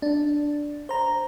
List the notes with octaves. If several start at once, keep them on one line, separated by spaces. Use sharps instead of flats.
D4
C5 A#5